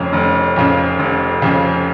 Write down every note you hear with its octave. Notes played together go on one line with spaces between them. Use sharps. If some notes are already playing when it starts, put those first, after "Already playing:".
Already playing: F1 F2 C#3 C#4
F1
F2 C#3
F1
F2 C#3